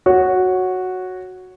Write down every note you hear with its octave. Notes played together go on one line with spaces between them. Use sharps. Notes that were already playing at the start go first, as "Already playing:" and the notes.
F#4 C#5